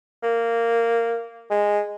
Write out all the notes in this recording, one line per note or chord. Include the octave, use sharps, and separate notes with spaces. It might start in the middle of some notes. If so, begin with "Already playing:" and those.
A#3
G#3